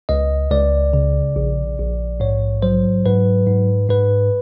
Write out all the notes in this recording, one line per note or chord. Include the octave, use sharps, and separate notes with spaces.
C#2 D#5
C#2 D5
C#3
A#1
A#1
G#2 C#5
F#3 C5
G#2 B4
G#2
G#2 B4